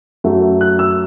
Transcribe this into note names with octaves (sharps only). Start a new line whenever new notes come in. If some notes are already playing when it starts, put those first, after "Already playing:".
F#2 F#3 A3
F#6
E6